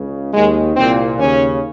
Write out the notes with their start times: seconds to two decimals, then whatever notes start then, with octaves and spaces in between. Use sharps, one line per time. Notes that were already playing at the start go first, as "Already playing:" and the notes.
Already playing: C#2 C#3
0.34 D#2 D#3 G#3
0.76 C2 A#2 C4
1.18 D#2 C#3 C#4